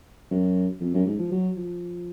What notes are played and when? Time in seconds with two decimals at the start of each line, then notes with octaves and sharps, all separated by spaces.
0.31 F#2
0.80 F2
0.94 F#2
1.06 G#2
1.19 F3
1.31 F#3
1.57 F3